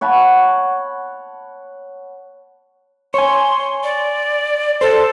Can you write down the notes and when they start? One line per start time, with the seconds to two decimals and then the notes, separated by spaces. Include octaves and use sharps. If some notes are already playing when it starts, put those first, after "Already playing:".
0.01 C#5 F#5 A5 B5
3.14 C#5 G#5 C6
3.83 D5
4.81 A4 C5